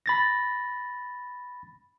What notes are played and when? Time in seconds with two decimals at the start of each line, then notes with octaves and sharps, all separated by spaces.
0.06 B5 A6 A#6